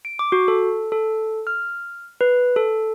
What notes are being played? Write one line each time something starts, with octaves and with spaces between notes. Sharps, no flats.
D7
D6
F#4
A4
A4
F6
B4
A4